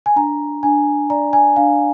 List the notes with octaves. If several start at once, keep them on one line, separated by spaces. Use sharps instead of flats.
G#5
D4 A#5
D4 G#5
D5 A#5
G#5
D4 F5